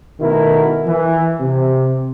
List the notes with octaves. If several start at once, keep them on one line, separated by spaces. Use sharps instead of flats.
B2 D#3 A3 E4 F#4 A#4
E3
C3